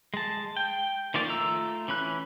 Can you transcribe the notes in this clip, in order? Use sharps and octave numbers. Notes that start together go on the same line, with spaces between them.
G#3 A5
G5
D#3 F3 A#3 D5
A3 F4 A#5 E6
E3 C#4 B5 F#6